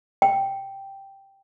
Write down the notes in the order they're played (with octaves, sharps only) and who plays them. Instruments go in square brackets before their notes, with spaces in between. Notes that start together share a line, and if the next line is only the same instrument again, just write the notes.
[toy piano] G5